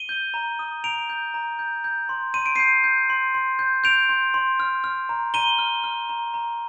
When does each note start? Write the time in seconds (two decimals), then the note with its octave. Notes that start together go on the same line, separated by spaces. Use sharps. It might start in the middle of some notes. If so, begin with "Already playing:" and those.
Already playing: D#7 G7
0.09 G6
0.34 A#5
0.59 D#6
0.84 A#5 D7 F7
1.10 G6
1.34 A#5
1.59 G6
1.84 G6
2.09 C6
2.34 C6 D#7
2.46 D7
2.55 G6 C7 D#7
2.84 G6
3.10 C6
3.35 C6
3.59 G6
3.84 G6 D7 F7
4.09 C6
4.34 C6
4.60 F6
4.84 F6
5.09 A#5
5.34 A#5 D#7 G7
5.59 F6
5.84 F6
6.09 A#5
6.34 A#5